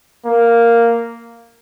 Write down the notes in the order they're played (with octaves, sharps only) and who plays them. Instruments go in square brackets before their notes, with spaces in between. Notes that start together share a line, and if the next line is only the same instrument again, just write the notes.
[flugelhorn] A#3